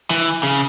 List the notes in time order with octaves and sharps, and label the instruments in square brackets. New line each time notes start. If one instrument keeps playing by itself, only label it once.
[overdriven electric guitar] E3
C#3